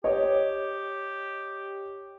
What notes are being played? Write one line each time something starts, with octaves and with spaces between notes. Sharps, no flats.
G4 C#5 D#5